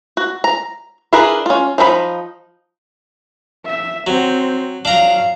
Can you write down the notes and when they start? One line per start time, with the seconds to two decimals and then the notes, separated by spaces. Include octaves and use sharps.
0.17 F#4
0.44 A#5
1.13 D4 E4 G#4 A#4 B4
1.46 C#4 F4
1.78 F3 D#4 E4 B5
3.65 E5
4.07 F#3 C4
4.85 F#3 D4 F5 A#5